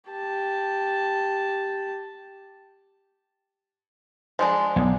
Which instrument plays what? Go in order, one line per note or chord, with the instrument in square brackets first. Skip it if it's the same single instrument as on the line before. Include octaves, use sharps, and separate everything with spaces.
[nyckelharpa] G4 A5
[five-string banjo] F3 G#3 D4
[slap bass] B1